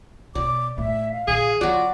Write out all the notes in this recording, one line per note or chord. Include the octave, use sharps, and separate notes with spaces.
B2 D5 D6
A2 E5
F5
A#2 D3 G#4
F#3 B3 F4 F#4 D5